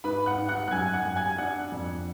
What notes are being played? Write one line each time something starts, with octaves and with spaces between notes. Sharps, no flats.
G#2 B4 B5
F#5 F#6
G#2
F#5 F#6
F#6
F#2 G#5 G#6
F#5 F#6
F#2
G#5 G#6
D4 F#5 F#6
F2